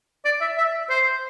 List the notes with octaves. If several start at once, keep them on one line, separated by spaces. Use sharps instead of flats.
D5
E5
E5
C5